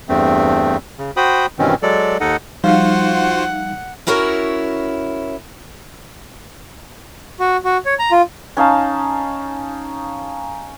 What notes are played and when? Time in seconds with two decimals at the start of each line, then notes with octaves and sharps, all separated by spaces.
0.09 E2 G2 A3 C4
0.98 C#3
1.17 F#4 C5 G5 B5 D#6
1.59 G2 B2 D#3 E3 C4 C#4
1.83 F#3 G#3 A4 D5
2.21 D#2 D#4 A4 D#5 F#5
2.64 F3 G3 D#4 F4 F#4 C5 F5 F#5
4.07 C#4 E4 F#4 A#4 C#5
7.40 F#4
7.64 F#4
7.86 C#5
7.99 A#5
8.12 F4
8.57 C#4 D#4 F5 A5